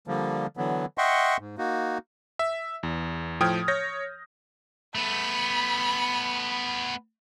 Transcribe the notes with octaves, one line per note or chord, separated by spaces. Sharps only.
D3 F3 G3 A#3
D3 E3 F#3 B3
D#5 E5 F#5 G5 C6 C#6
G#2
A#3 D#4 F#4
E5
E2
A2 F3 G5 D#6 F6 G#6
C#5 G6 A#6
A3 B3 B5